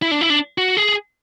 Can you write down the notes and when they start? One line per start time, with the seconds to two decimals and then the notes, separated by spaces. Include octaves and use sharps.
0.02 E4
0.11 D4
0.21 E4
0.30 D4
0.58 F#4
0.77 G#4